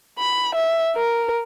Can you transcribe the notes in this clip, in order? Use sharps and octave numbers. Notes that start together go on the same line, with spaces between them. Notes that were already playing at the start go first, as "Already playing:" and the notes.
B5
E5
A#4